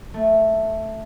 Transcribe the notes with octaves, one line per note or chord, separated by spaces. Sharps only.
A3